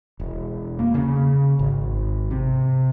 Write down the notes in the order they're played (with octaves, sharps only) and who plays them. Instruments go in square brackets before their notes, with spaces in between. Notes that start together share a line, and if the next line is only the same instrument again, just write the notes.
[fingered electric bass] E1
A#3
C#3
G#1
C3